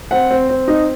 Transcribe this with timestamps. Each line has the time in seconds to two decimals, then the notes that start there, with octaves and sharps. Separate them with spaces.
0.11 C4 F#5
0.31 C4
0.50 C4
0.68 D#4